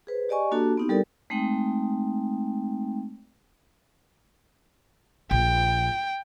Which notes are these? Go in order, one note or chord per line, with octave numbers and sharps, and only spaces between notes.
G#4 B4 C5
G4 D5 D#5 G#5 C#6
A#3 D4 F#4 G4 A4 A5
B3 C4 D#4 E4 G4
G3 G4 A4 A#4 D5
G#3 A3 C4 D#4 G5
A#1 G5